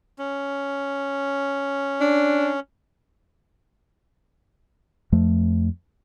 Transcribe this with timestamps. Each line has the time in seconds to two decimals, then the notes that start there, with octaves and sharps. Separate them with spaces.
0.19 C#4
2.01 D4
5.12 F2 F3 A3